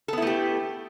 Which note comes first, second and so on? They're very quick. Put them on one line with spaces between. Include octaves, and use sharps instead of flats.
A4 B3 E4 A3 G4